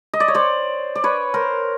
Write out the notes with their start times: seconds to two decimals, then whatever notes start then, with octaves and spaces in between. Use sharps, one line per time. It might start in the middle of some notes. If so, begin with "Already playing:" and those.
0.14 D#5
0.20 D5
0.28 C#5
0.35 C5 D5
0.96 D5
1.04 B4 C#5
1.34 A#4 C5